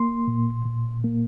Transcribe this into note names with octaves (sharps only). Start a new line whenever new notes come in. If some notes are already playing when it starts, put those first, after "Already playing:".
Already playing: A#3 C6
A#2
A#2
A#3